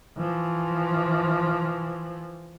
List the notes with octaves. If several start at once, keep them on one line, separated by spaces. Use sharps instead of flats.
E3 F3